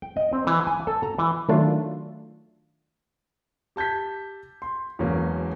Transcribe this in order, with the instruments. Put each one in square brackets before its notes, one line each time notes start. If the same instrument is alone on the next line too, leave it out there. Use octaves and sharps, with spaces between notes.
[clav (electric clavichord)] G5
D#5
C4
E3
G#5
A4
A#5
E3
[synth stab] D#3 F#3 A3 D4 F4
[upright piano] G4 A5 G6 G#6 B6
C6
E1 E2 F#3 A#3 C#4 A#4